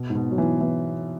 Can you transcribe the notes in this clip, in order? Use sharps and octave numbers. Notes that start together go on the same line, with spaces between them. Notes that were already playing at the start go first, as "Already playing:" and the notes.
Already playing: B2
G#2
B2
F#3
E3
E3